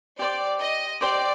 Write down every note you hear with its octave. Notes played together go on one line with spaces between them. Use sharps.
G4 C5 D5 G5 D6
D#5
G4 C5 D5 G5 D6